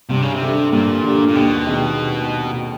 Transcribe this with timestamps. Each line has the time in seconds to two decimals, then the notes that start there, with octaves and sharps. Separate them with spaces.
0.09 G2 C3
0.22 C#3
0.34 C3
0.42 D3 G3
0.72 G2 A#2
1.04 D3 G3
1.28 A#2
1.35 D#2 B2
1.67 D#3 G#3 C4